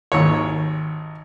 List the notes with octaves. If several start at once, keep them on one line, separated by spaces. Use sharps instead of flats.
G#1 D#2 C#5